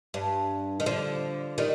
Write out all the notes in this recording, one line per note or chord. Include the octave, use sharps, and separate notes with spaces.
G2
D#3
D3 F3
D#3 G3